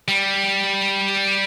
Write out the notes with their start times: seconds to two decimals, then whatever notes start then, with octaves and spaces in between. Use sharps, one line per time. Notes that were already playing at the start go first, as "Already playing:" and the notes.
0.08 G3